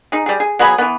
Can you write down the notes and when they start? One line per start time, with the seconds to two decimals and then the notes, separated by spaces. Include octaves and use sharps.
0.12 D#4 G#4
0.26 G3 G#4
0.40 G#4
0.59 F#3 B3 G#4 B5
0.78 E3 B3